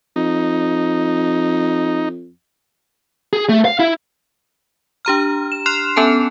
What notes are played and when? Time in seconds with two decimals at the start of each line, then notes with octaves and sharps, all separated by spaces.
0.16 F2 D#4
3.33 G#4
3.49 A3
3.65 F5
3.79 E4
5.05 D4 G4 A#5 F6
5.52 E7
5.66 C6 F6 F#6 C7 E7 F7
5.96 B3 C#4 A4 G#5 A5